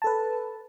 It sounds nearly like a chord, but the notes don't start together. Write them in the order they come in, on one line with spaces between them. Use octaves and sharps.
A5 A4 B4